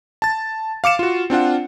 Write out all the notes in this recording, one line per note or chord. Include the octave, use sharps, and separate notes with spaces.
A5 A6
F5 D6 C#7 E7
F4 F#4
C4 D4 F4 F#5